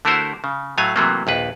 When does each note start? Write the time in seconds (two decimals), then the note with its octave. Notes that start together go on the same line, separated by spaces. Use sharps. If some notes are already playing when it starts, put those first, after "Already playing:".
0.05 D3 A3 E4 F#4 A#4 C5
0.44 C#3
0.78 A2 F#3 A3 F5 G#5
0.96 C3 E3 F#3 A3 A#3
1.27 A#1 D#2 B4